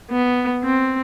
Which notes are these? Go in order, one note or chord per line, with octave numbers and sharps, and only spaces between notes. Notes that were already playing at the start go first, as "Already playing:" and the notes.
B3
C4